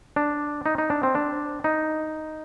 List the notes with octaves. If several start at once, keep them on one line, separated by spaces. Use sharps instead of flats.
D4
D#4
D#4
D4
C4
D4
D#4